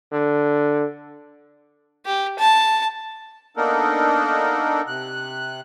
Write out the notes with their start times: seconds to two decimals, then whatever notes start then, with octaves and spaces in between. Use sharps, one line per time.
0.12 D3
2.06 G4
2.39 A5
3.57 A#3 B3 D4 D#4 A4 A#4
4.87 C3 F#6